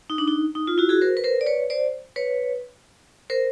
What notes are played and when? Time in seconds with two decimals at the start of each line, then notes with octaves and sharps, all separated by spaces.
0.10 D#4
0.18 D4
0.28 D#4
0.55 D#4
0.67 F4
0.78 E4 F#4
0.89 F#4 G#4
1.01 A#4 C5
1.17 B4
1.24 A#4 C5
1.41 D5
1.46 B4 C#5
1.70 C5 D5
2.16 B4 C#5
3.30 A#4 C5